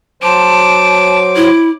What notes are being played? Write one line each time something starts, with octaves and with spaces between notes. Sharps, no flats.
F#3 C5 A5 D6
E4